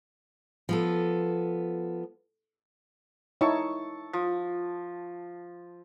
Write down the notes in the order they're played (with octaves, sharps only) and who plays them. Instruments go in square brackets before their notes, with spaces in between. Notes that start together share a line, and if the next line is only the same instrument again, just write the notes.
[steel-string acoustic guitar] F3 B3 A4
[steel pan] D#4 E4 C#5 [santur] A5 C#6 E6
[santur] F3